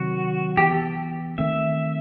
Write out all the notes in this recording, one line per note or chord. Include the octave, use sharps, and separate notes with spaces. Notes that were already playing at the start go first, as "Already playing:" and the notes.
Already playing: C3 D#3 F#3 C4 F#4
E3 B3 G4
A4
D#3 A3 C4 E5